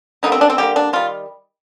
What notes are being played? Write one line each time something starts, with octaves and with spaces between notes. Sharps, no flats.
D3 G3 A#3 D#4
C4
D4
C4
D3 G3 A#3 G4
D4
D#3 G3 F4